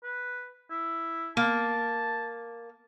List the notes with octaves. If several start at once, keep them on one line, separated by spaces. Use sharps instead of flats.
B4
E4
A#3 A5